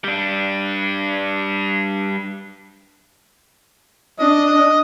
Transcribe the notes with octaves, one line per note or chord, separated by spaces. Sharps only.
G3 D4
D4 D#5